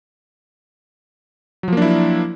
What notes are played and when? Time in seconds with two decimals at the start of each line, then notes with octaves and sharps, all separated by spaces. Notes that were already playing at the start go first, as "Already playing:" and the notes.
1.63 F#3
1.68 F3
1.73 A#3
1.77 D4
1.82 E4